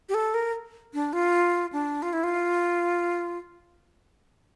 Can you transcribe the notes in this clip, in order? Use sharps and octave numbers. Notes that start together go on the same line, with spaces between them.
G4
A4
A#4
D4
F4
D4
F4
E4
F4